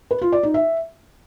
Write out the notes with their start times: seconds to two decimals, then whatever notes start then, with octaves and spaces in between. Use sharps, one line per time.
0.11 B4
0.22 F4
0.32 D5
0.43 D#4
0.54 E5